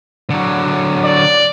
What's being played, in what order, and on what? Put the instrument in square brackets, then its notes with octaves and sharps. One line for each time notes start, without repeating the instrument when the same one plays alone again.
[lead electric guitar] D3 F#3
[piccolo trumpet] D5